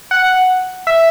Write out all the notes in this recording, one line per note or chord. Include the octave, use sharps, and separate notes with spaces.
F#5
E5